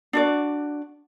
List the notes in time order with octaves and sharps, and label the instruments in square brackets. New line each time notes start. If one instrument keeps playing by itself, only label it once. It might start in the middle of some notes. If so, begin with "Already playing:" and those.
[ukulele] D4 F#4 D5